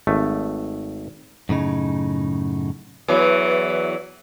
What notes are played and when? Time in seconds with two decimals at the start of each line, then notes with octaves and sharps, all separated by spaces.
0.07 G#1 A3
1.49 F#2 A2 C#3 D#4
3.08 E2 E3 F#3